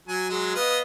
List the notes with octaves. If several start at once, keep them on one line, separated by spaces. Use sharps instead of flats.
F#3 G#5
F#3 G#3
B3 D#5 F5